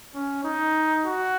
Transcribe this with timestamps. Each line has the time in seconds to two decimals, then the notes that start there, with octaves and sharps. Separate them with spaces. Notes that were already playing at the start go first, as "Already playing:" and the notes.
0.14 C#4
0.44 D#4
1.04 F#4